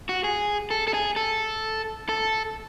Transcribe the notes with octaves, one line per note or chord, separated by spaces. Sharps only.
F#4
G#4
A4
A4
G#4
A4
A4